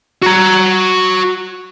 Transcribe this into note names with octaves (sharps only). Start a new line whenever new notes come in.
F#4 A#5